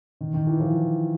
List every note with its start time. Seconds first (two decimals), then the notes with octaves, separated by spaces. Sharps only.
0.21 D#3
0.34 D#3
0.47 E3
0.60 F3